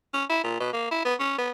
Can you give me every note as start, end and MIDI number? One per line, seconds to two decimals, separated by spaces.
0.14 0.24 61
0.30 0.42 64
0.44 0.56 46
0.60 0.73 47
0.73 0.89 58
0.91 1.01 64
1.05 1.14 59
1.20 1.38 61
1.38 1.51 59